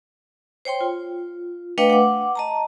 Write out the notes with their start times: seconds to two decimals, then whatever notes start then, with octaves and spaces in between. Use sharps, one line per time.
0.65 C5 C#5 G5 C6
0.81 F4
1.78 A3 D4 B4 D#5 F5 G5
1.90 F#5 D6
2.35 D#5 A5 A#5